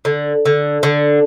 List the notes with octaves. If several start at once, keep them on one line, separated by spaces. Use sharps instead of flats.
D3
D3
D3